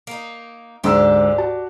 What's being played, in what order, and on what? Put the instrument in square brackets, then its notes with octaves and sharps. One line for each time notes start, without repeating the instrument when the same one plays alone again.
[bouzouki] A#3 D#4
[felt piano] D2 G#2 E6 [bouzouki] D4 G4
[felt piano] F#4 A5